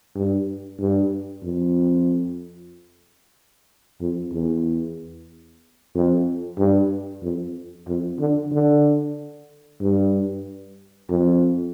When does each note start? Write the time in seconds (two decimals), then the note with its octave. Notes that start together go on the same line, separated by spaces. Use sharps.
0.15 G2
0.79 G2
1.43 F2
4.01 F2
4.33 E2
5.95 F2
6.58 G2
7.23 F2
7.88 F2
8.19 D3
8.53 D3
9.81 G2
11.10 F2